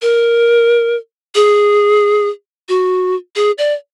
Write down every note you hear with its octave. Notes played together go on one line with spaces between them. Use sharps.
A#4
G#4
F#4
G#4
D5